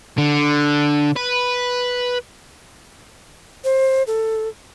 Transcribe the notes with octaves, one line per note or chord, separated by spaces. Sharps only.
D3
B4
C5
A4